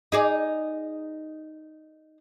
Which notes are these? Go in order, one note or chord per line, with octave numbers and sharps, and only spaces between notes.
D#4 G#4 D5